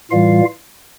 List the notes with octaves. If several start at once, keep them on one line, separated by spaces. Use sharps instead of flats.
A2 E3 G3 F4 F5